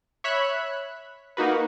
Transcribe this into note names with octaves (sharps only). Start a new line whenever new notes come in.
C#5 E5 B5 F#6 B6
A#3 D#4 F#4 B4